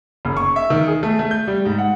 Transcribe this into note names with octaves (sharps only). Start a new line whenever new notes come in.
F#1
C#6
E5
D#3
G#4
A3
A3
G6
G3
G#2
F#5